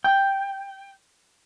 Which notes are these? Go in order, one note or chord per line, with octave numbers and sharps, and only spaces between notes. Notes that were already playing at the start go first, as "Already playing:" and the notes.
G5